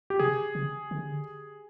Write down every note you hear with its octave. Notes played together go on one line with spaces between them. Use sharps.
G4
C3 G#4
C#3
D3